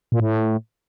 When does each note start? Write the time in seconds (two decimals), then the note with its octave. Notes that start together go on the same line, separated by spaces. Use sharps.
0.12 A#2
0.20 A2